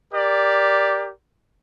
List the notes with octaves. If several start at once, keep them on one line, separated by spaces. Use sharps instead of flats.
G4 A#4 D5